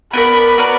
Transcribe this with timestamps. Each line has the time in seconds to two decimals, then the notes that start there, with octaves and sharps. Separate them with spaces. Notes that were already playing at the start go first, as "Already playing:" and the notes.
0.13 B3 F#4 A#4 D5 B5
0.58 B3 F#4 A#4 D5